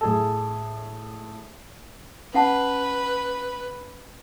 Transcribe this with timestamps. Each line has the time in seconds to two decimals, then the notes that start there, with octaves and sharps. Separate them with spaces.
0.01 A2 G#4 A4
2.34 C#4 B4 F#5 A5